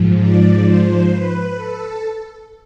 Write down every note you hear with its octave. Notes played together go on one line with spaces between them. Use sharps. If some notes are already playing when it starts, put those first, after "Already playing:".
Already playing: G#2 F3
D5
C5
B4
A4